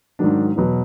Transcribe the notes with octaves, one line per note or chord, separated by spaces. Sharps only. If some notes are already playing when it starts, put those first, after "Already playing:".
G#2 D#3 F#3 D4
E2 B2 F#3